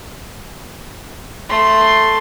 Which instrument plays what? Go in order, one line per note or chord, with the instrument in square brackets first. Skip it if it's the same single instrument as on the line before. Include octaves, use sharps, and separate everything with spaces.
[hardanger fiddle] A3 C6